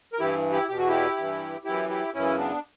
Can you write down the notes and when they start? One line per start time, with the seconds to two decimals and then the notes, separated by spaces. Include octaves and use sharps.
0.13 A#4
0.20 G2 E3 E4 G4
0.52 E4 G4
0.68 E2 B2 G4
0.78 F#4
0.88 E4 G4
1.17 G2 E3
1.65 F#2 E3 E4 G4
1.89 E4 G4
2.14 F#2 C#3 E3 C#4 E4
2.38 B3 D4